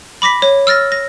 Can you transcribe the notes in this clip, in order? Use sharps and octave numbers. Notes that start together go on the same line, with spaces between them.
B5 D6 A#6 B6
C#5
E6 F6 A6 A#6
A#6